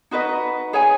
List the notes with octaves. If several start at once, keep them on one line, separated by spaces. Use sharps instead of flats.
D#4 F#4 B4 D#5
G#4 C#5 G#5